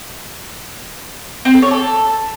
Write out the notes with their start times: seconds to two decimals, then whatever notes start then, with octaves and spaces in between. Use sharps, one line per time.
1.45 C4
1.54 A4
1.62 C#5
1.71 A4